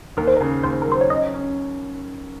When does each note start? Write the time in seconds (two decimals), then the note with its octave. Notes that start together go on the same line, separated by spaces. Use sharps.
0.17 D#2 A#4
0.27 C5
0.37 C#3 A#4
0.63 D#2 C5
0.82 A#4
0.87 F#3 C5
1.01 C#5
1.10 C#4 D#5
1.34 C#4